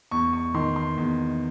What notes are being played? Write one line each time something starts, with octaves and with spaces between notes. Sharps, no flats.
E2 C#6
C#6
D#3 C6
C6
E2